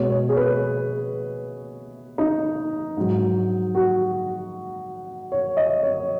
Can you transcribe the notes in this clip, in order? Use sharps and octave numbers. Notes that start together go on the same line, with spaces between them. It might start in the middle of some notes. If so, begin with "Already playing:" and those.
Already playing: B2 G#3 C#5
C#5
G#4
B4
D#4
G#2 F#3
F#4
C#5
D#5
C#5